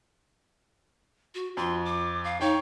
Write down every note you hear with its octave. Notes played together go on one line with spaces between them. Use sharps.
F#4
F2 C6
D6
F5
D#4 C#5 G5